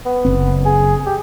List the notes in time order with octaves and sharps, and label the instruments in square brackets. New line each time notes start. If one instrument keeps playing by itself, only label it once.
[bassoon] B3
[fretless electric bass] F#1 C4
[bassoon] G#4
G4